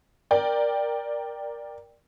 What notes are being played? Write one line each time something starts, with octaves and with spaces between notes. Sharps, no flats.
A#4 D5 G5